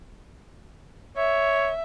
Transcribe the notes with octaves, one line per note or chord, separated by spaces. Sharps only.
C#5 E5